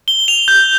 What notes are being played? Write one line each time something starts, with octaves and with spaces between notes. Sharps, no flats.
G7
F7
G6